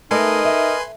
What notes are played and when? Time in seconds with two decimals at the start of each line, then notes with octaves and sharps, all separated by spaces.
0.11 A3 D#4 A#4 B4 D#5 G#5 C6
0.45 E5